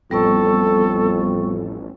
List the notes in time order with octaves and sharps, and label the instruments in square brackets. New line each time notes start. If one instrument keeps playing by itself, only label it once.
[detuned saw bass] A1 [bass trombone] F2 [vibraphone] G3 B3 C#6 [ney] A4